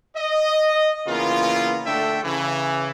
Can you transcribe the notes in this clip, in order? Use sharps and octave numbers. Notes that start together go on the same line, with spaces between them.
D#5
C#3 E3 A#3 B3 F4
D3 A3 D4 A4 E5 G5
C#3 E3